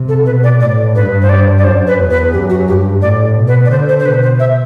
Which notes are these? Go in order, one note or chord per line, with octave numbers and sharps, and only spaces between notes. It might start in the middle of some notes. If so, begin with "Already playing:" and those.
Already playing: C3
A4
B2 B4
D5
A2 D5
G2 B4
C5
D5
D5
F#2 C5
B4
E2
B4
F#2 G4
F#4
G2 G4
A2 D5
B2
B4
D5
D3 C5
C5
C5
B2 B4
C5
E5